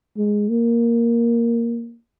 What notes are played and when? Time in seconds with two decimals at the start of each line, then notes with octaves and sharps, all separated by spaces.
0.17 G#3
0.49 A#3